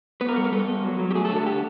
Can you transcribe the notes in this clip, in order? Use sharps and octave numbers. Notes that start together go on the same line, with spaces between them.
B3 B4
A#4
G3 A4
A#4
G3 A4
B3
F#3
F#3
G4
A3 G#4
A4
D3
A4
G4